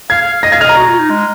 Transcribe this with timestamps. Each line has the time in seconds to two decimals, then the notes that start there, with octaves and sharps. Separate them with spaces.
0.10 F5 G#6
0.21 F5
0.33 F5
0.43 D#5 A#6
0.52 F5 G#6
0.61 D#5 F6
0.69 A#5
0.77 F#4
0.88 F4
0.99 D#4
1.10 G#3